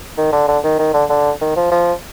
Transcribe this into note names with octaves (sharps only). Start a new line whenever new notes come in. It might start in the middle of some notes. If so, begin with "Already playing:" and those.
D#3
D3
D3
D#3
D#3
D3
D3
D#3
F3
F3